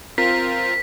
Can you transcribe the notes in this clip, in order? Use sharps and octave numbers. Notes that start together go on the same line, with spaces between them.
C4 F4 A#4 B6